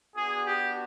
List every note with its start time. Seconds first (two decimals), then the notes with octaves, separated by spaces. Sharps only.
0.16 B3 D4 F#4 G#4
0.45 G4